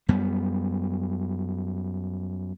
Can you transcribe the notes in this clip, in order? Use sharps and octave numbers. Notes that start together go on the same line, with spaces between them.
F#2 G3 B3